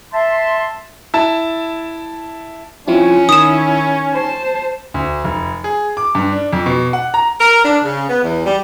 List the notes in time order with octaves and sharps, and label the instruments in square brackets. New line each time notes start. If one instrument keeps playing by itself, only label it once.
[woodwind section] E5 A5 C6
[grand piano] E4 A5
[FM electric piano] F3 C4 E4 [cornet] C#4 [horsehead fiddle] F4
[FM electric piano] D#3 [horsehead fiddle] E4 [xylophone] D#6 E7
[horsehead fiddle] C5 A5
[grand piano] D2
F1
G#4
D6
G2
D4
F2
B2
F#5
A#5
[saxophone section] A#4
D4
C#3
B3
E2
G3